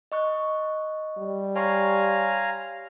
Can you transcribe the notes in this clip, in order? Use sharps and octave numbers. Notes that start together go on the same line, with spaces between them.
D#5 C#6 F#6
G3
C#5 F5 G#5 A#5 C6 C#6